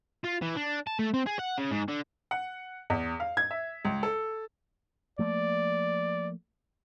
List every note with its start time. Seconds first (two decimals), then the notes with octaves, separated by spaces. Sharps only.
0.24 F4
0.42 E3
0.56 D4
0.87 A5
0.99 A3
1.14 C4
1.26 G#4
1.39 F#5
1.58 C#3
1.71 G#2
1.88 D3
2.31 F#5
2.90 E2
3.20 F5
3.37 G#6
3.51 E5
3.85 C#2
4.03 A4
5.19 F3 A3 A#3 D5